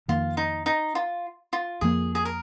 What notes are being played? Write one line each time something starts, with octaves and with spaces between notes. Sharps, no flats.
F2 D#3 A#3 F4
D#4
D#4
F4
F4
F2 F3 A#3 G#4
G#4
A#4